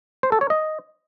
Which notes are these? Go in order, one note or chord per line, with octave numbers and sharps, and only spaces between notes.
C5
A4
C#5
D#5